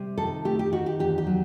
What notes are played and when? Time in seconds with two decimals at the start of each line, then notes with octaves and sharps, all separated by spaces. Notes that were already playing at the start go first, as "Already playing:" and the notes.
Already playing: C3 G3
0.18 D#3 A4
0.45 A3 G4
0.59 G4
0.72 D#3 F#4
0.86 G4
0.99 E2 G4
1.18 G4
1.26 F#3